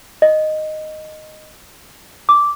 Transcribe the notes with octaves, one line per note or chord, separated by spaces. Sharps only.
D#5
D6